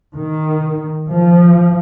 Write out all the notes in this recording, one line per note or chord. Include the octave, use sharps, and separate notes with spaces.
D#3
F3